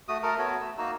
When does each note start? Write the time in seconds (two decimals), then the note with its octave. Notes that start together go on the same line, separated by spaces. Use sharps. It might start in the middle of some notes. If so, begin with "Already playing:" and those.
0.08 A3 F#4 D#6
0.23 A3 A4 A#4
0.39 B3 F#4 A4 C#5
0.61 A3 E6
0.77 A#3 D#4 F#4 E6